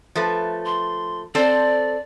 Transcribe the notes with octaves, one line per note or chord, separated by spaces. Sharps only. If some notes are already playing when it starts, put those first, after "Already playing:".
F3 A3 B4
C6
C4 A4 C5 D5